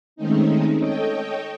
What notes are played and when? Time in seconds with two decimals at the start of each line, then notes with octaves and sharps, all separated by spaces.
0.16 D#3 G#3 A3 C4 C#4 D#4
0.78 A4 C#5 D#5 G5